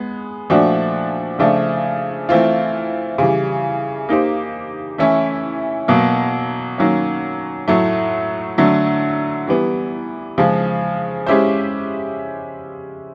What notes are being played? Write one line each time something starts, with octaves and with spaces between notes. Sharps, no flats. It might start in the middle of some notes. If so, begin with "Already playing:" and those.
Already playing: G#3 B3
A#2 F3 A3 D4 F#4
C#3 F3 A3 D4
E3 A3 C4 F4
C#3 E3 G3
A#3 D#4 G4 C5
E3 A3 C#4 E4
B2 F#3 A#3
D#3 F#3 A#3 C#4
A2 F#3 A3
D3 F#3 A3
E3 G3 B3
C#3 F3 G#3
G#3 C#4 E4 G4 C5